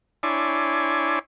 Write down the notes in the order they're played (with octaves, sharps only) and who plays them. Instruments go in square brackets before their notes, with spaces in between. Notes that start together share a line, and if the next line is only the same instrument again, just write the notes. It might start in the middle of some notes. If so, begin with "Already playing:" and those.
[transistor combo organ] D4 E4 C#5 D5 G#5 C6